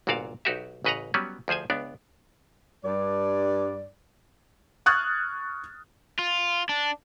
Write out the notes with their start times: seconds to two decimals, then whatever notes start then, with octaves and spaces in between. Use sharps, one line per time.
0.07 G1 C2 A#2 F#4 D5 F5
0.45 B1 D#4 F#4 G4 E5
0.85 A1 C#3 B4 D#5 F#5 A#5
1.14 F#3 G3 B3 C#4 B4
1.48 D2 F3 G#4 C5 G#5
1.70 C#2 B3 D4 D5
2.85 G2 D5
4.86 C#6 D#6 F6 F#6 G#6 A6
6.19 F4
6.69 D4